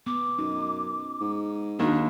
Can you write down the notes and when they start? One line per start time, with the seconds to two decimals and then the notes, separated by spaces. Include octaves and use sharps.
0.07 B3 D6
0.39 F#2 D#4
1.21 G#2
1.79 D#2 D4 D#4 F#4